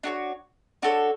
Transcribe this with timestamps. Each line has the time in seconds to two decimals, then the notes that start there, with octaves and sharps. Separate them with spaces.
0.03 D4 F#4 A4 C#5
0.82 D4 F#4 A4 C#5